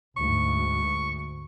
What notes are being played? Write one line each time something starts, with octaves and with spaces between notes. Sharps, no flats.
D2 G#2 C#6